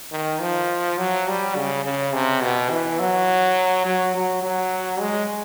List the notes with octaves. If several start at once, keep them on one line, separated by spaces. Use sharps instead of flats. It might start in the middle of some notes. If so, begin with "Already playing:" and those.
D#3
F3
F#3
G3
C#3
C#3
C3
B2
E3
F#3
F#3
F#3
F#3
G#3